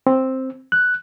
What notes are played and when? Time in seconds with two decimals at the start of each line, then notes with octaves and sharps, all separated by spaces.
0.07 C4
0.72 F#6